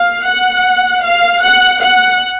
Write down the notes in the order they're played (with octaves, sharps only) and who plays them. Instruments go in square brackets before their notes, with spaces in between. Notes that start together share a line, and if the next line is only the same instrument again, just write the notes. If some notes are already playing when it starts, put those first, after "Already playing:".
Already playing: [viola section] F5
F#5
F5
F#5
F#5